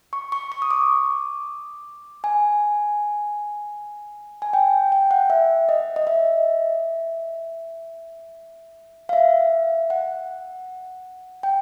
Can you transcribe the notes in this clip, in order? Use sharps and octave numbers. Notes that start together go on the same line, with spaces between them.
C#6
C#6
C#6
D#6
D6
G#5
G#5
G5
G5
F#5
E5
D#5
D#5
E5
F5
E5
F#5
G5